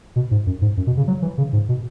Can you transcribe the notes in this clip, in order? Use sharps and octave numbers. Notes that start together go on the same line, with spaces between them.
B2
G#2
F#2
G#2
F#2
B2
C#3
F#3
E3
C#3
G#2
B2